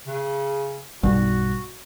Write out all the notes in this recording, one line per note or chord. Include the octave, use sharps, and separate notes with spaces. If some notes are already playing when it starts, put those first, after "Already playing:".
C#3
B1 G2 G3 F#4